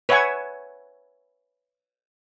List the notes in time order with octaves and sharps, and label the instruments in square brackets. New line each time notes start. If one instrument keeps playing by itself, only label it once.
[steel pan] B4 C#5 E5 F#5 G#5 C#6